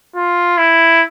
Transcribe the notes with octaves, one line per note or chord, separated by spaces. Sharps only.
F4
E4